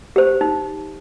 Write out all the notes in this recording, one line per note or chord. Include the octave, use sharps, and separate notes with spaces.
G4 C5
D#4